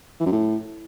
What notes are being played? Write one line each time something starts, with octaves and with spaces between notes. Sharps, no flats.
E3
F#2
A2